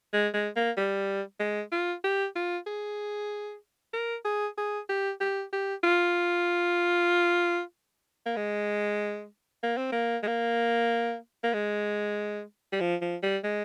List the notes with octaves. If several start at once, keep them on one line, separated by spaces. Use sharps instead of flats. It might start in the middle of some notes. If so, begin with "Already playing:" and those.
G#3
G#3
A#3
G3
G#3
F4
G4
F4
G#4
A#4
G#4
G#4
G4
G4
G4
F4
A#3
G#3
A#3
C4
A#3
G#3
A#3
A#3
G#3
G3
F3
F3
G3
G#3